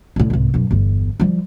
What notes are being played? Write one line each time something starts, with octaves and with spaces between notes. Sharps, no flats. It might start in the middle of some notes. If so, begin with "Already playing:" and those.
A2 D3
C2 G#2
F#2 B2
G1 E2
F3 G3